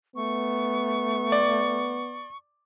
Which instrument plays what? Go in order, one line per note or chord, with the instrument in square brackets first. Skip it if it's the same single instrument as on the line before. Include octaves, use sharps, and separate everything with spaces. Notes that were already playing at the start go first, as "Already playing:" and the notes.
[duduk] A3 [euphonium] B3 [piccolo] C#6
[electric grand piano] D5